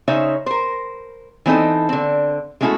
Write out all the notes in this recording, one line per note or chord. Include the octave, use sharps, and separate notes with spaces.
C#3 D#4 C5 C#5 E5
A#4 C5
E3 C4 D#4 A4
D3 C4
G#3 A3 C#4 E4 F#4 A4